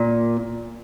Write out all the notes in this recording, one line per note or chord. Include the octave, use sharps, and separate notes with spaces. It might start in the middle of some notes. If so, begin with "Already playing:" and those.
Already playing: A#2